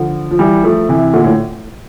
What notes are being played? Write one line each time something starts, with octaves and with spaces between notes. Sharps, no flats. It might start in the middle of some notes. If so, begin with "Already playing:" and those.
Already playing: D3 F3
F3
E3 G3
F3 A3
C3 E3
A#2 D3
A2